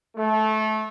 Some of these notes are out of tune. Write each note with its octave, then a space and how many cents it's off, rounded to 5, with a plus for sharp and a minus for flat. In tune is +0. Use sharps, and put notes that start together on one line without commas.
A3 -20